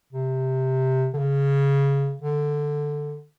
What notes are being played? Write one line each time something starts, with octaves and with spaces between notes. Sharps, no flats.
C3
D3
C#3
D3